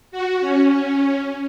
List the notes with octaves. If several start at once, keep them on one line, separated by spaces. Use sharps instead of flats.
F#4
C#4